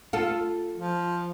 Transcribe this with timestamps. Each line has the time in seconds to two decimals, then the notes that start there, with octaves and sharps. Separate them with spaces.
0.13 F4 A4
0.77 F3